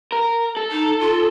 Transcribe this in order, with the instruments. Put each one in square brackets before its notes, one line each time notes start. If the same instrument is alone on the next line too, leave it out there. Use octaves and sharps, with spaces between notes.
[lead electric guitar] A#4
A4
[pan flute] D#4
F4